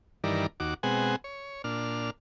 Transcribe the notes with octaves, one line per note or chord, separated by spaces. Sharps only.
G2 D#3 E3 A#4 D5
D#2 F#4 D6
B2 G#3 C4 F#5 G#5
C#5
A#2 D4 F6